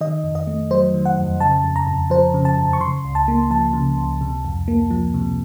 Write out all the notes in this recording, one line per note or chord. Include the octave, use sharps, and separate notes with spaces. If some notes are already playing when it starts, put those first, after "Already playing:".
D#3 D#5
F2
D#5
A3
F#3 C5
D#3
F#5
F2
C#3 A5
F2
A#5
F2
F3 C5
C#3
A5
F2
C#6
C#3 C6
C#2
A5
A#3
F3 A5
C#3
C#2
C3
F2
A#3
F3
C3